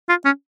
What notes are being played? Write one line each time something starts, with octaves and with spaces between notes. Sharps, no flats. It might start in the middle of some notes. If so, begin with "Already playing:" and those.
F4
C#4